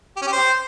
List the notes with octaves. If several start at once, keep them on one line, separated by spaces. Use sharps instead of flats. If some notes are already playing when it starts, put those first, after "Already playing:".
G4
C#4
G4
C5